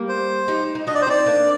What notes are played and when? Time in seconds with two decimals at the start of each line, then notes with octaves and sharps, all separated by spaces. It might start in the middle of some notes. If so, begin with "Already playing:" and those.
Already playing: G3 A#3
0.09 C5
0.48 D#4 G4
0.75 D#4
0.87 D4 F#4 D#5
0.95 D5
1.02 C5
1.06 C4 D#4 D5
1.26 A#3 D4